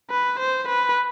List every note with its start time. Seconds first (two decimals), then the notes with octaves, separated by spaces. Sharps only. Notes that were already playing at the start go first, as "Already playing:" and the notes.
0.10 B4
0.39 C5
0.68 B4